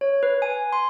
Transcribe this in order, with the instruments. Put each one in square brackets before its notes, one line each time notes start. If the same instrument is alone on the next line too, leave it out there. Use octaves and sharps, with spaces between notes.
[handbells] C#5
B4
G#5
C6